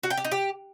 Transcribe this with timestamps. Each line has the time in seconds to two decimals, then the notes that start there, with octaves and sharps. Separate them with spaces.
0.03 F#4
0.10 G5
0.17 G4
0.24 D#4
0.32 G4